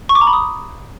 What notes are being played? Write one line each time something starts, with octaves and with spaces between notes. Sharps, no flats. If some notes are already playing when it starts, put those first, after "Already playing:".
C#6
D6
A#5
B5
D#6